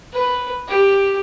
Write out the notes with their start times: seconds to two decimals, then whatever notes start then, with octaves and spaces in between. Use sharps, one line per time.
0.13 B4
0.68 G4